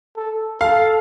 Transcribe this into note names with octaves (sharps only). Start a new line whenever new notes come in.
A4
A4 F5